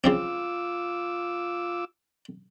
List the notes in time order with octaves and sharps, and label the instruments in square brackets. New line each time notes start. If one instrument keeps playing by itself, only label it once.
[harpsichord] C#3 F3 C4 [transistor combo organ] F4 D6 E6